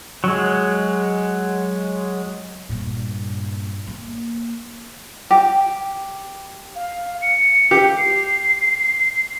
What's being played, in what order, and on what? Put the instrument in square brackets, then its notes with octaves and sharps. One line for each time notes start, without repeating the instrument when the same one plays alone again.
[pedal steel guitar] F#3 G#3
[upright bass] G2 A#2
A#3
[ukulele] G4
[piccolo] F5
C#7
[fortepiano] G4
[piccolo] C7